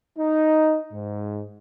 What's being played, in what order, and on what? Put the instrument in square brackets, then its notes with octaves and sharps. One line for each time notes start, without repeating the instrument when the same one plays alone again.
[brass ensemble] D#4
G#2